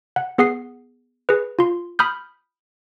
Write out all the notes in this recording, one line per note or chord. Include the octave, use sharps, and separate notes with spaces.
F#5
B3 G#4 F#5 D#6 C7
G#4 B4
F4 C6
B5 D#6 F6 G6